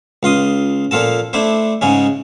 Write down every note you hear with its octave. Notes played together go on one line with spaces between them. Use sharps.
C#2 F4 C6 D#6
A#2 F3 F4 A4 A5
A3 D4 E4 C5
G#2 C#3 G#3 C#4